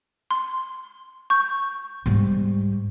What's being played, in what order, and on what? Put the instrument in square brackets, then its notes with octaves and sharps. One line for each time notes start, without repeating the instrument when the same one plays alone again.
[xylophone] C6
C#6 G6
[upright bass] G#2 G3